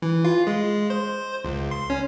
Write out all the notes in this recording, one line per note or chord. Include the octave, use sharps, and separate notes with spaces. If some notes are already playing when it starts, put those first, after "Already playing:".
E3
F4
G#3
C5
C#2
C6
C#4